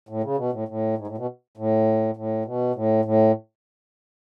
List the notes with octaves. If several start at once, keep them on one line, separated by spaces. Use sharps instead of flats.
A2
C#3
B2
A2
A2
G#2
A2
B2
A2
A2
B2
A2
A2